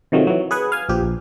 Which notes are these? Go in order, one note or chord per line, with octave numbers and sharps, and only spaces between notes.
C3 D#3 F3 F#3 A3
E3 F#3
G#4 B4 F#5 G#5
F5 G#5
A#1 F3 G4
A#1